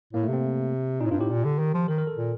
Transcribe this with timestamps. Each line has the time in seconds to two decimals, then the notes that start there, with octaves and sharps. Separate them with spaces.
0.13 A2 A#3
0.23 A3
0.28 C3
0.33 C4
1.01 A#2 D#4
1.06 A2
1.11 G2 F4
1.20 A2 G4
1.30 A#2
1.45 D3
1.59 D#3
1.74 F3
1.88 D#3 A#4
1.98 A#4
2.07 A4
2.17 A#2